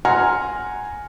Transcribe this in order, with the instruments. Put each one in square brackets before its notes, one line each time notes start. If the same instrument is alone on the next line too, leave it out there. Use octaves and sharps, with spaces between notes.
[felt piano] F#5 G#5 A#5 C6 F6